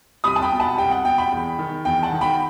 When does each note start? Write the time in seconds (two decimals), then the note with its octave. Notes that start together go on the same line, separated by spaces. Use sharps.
0.24 C2 B5 D#6
0.36 A5
0.42 G5 B5
0.52 B2
0.60 F#5 A5
0.78 C2 G5
0.91 F#5
1.05 B2 G5
1.18 G5 B5
1.32 E2
1.59 D#3
1.85 E2 G5
2.03 F#5 A5
2.12 D#3
2.21 G5 B5